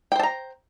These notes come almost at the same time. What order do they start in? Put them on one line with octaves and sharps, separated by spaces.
G5 C5 A5 A#5